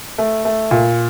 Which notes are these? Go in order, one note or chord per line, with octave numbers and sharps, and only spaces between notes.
A3
A3
A#2